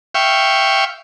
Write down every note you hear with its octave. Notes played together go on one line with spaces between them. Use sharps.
E5 F5 G5 C#6